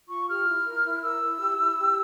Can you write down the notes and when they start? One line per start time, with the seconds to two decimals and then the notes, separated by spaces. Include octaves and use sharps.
0.09 F4 C#6
0.28 G4 F6
0.47 E4
0.66 A#4
0.84 E4
1.02 A#4 E6
1.21 E4
1.40 G4
1.58 E4
1.77 G4